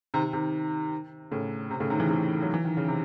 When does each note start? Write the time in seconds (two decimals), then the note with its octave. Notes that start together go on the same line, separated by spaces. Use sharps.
0.14 C3 D#3
0.33 C3 D#3
1.31 A2 C#3
1.71 C3
1.80 A2 C#3
1.90 C3 D#3
2.00 C#3 E3
2.09 C3 D#3
2.43 F#3
2.54 E3
2.65 D#3
2.77 C#3
2.88 C3